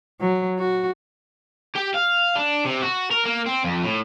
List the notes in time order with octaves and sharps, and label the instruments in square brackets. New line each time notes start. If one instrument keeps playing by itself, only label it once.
[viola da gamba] F#3
F#4
[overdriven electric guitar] G4
F5
D4
C3
F#4
A#4
A#3
C4
F2
A2